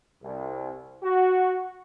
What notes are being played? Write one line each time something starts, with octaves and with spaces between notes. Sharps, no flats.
C2
F#4